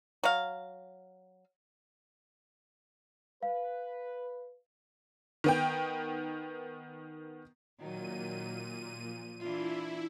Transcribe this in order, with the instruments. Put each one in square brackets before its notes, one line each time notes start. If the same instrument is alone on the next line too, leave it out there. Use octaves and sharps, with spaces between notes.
[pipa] F#3 F5
[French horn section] B4 [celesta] F5
[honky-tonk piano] D#3 B3 G5
[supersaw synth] A#2 D#7 [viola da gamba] D#3 F#3
[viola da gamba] F3
[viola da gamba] E3 D4 F4 [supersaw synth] E4